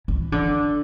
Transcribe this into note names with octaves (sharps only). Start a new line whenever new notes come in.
E3
D3